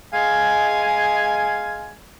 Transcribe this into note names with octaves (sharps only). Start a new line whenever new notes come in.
G#3 F5 G#5